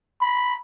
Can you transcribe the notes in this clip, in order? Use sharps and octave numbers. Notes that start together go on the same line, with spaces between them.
B5